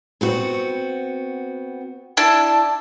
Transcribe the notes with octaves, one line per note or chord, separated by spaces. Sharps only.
B3 C4 F#4
D4 E4 A5